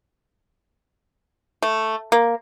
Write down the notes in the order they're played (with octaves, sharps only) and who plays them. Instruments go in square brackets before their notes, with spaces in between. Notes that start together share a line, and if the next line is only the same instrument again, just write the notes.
[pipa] A3
A#3